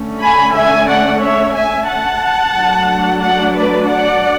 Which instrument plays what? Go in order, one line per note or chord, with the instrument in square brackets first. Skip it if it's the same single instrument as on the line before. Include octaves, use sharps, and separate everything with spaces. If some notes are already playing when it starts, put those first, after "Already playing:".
Already playing: [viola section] D3 A3 C#4
G#5 B5
E5 G#5
D5 F#5
C#5 E5
E5 G#5
F#5 A5
F#3 A3 D4
D5 F#5
B4 D5
D5 F#5